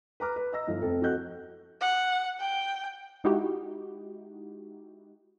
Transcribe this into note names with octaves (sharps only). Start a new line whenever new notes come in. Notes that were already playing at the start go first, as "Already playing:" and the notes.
B4 A#5 D6 F6
B4
D#5 A#5 E6 A#6
G1 F3 D#4
F1 C4 A4
F2 F#4 A4 D#5 F#6 G6
F#5
G5
G#3 D#4 E4 F#4 G4